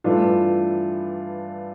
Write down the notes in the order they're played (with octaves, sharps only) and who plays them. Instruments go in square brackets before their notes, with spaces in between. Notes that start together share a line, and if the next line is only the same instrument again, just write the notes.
[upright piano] G2 E3 A3 D4 F4